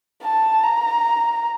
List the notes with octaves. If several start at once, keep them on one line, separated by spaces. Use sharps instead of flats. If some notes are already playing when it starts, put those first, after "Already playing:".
A5
A#5